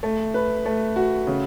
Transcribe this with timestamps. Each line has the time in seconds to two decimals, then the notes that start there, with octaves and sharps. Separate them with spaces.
0.03 A3
0.34 B4
0.66 A3
0.96 F#4
1.27 C#3